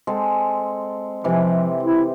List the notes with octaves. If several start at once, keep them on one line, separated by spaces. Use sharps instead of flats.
G#3 C4 A4
C3 E3 F3
E4